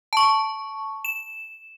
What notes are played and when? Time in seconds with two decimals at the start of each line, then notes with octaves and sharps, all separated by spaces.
0.13 A5 C#6
1.05 E7